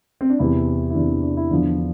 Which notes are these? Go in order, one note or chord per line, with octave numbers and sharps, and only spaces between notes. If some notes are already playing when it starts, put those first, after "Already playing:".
C4
D4
E2 C3 E3 E4
E4
E2 C3 E3 D4
D4
D4
E4
E2 D3 F3 D4
D4